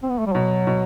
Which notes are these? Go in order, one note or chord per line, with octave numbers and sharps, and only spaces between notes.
C4
B3
A3
G3
B2 F#3
B2